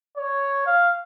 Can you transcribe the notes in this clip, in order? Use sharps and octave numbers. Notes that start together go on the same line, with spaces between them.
C#5
F5